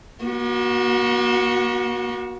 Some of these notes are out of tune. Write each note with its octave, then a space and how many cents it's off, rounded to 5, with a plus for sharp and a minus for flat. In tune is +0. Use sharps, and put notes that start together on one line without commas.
A#3 +45 F#4 +0